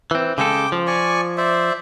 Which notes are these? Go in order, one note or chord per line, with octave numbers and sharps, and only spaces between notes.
E3 C4
C#3 G#3 A4 G5 D6
F3
D5 G#5 C#6
C5 D5 E5